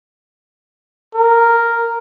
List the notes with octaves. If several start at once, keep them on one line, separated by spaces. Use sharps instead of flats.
A#4